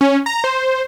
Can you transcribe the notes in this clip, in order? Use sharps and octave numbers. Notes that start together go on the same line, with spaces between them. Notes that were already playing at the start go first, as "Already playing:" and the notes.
C#4
A#5
C5